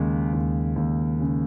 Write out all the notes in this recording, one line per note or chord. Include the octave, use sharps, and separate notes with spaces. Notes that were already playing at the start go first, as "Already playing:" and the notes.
Already playing: D#2 C#3 G#3
D#2
D#2
C#3